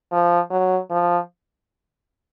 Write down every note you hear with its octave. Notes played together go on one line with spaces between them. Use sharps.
F3
F#3
F3